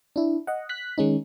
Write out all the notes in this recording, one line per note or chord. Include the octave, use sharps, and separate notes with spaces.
D4 E4
D#5 F#5
F#6 B6
D#3 G#3 C#4 D#4